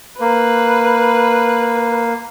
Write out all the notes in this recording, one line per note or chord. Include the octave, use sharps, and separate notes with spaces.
A#3 B4